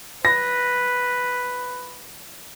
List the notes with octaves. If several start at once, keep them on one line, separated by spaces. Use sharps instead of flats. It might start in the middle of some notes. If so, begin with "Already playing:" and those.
B4 A#6